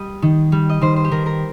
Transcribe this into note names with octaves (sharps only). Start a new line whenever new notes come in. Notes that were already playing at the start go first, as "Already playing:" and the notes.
Already playing: G3 D#5
D#3
G3
D#5
D#3 C5
C5
G4
D#3 A#4
A#4